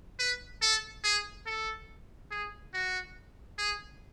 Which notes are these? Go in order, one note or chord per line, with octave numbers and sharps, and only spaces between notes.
B4
A4
G#4
A4
G#4
F#4
G#4